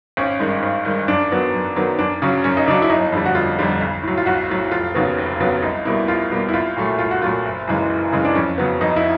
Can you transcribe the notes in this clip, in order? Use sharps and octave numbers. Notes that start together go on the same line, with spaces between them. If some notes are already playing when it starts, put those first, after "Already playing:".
G#1 C#4
G2 D#3 G#3
G#1
G2 D#3 G#3
F#2 D4
D#3 F#3 B3
F#2
D#3 F#3 B3
F#2 D4
C#3 F#3 C#4
F#2 C#4
D#4
C#3 F#3 D4
E4
G1 D#4
F2 D3 G3
F#4
G1 F4
F2 D3 G3
B1
A2 F#3
F4
B1 F#4
A2 F#3
F1 F4
D#2 C#3 F#3 B3
F1
D#2 C#3 F#3 B3
C2 D#4
B2 G3 A#3 E4
C2 F4
B2 G3 A#3
E4
C2 F4
A#2 F#3 A3
C2 F4
F#4
A#2 F#3 A3 F4
F#1
F#2 C#3 E3 G#3
F#1
F#2 C#3 E3 G#3
D4
F2 C#4
C#3 F#3 B3
F2 D#4
E4